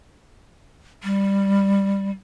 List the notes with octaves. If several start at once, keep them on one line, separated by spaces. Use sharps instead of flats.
G3